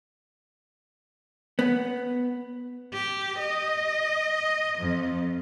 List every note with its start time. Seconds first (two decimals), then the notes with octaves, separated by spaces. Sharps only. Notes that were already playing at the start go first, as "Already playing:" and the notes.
1.59 B3
2.94 G4
3.39 D#5
4.79 F2